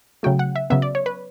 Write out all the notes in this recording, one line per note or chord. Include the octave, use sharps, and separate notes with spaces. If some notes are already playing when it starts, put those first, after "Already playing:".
C#3 F#3 A3 G5
F#5
E5
C#3 F#3 B3 E5
D5
C#5
B4